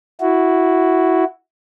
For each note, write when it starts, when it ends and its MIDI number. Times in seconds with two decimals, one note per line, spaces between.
0.21 1.24 64
0.21 1.24 66